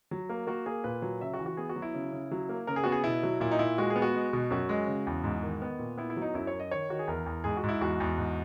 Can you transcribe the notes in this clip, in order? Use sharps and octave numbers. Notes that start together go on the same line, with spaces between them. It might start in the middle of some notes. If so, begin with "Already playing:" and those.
F#3
A#3
A#3 F#4
A#3 G#4
A#2 B4
F#3
C#3 E5
F#4
E3
F#4
B3 G#4
F#4
F#3
E4
C#3
C#3
F#3
A#3
C#3 A#4
G#4
B3 F#4
G#4
B2 E4
F#3
A#2 E4
D#4
A#2 E4
G#3 F#4
G#4
B3
F#4
G#3
B2
F#2 F#4
G#3
C#3
E2
G#2
D#3
B3
A#2
B3 E4
E4
F#3
D#4
F#2 E4
C#5
F#2
D#5
D#3 C#5
D#3 F#4
G#4
E2 A#4
E2
G#2 G#4
F#4
G#2
E4
E2 F#4
E2
G#2